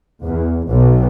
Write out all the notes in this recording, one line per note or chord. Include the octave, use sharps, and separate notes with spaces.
E2
B1